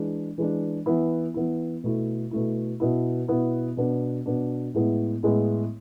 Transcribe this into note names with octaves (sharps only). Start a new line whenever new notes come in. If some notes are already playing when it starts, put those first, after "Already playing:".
Already playing: E3 G#3 D4
E3 G#3 D4
E3 B3 E4
E3 B3 E4
B2 A3 E4
B2 A3 E4
B2 B3 E4
B2 B3 E4
B2 B3 D4
B2 B3 D4
A2 G#3 B3 E4
A2 G#3 B3 E4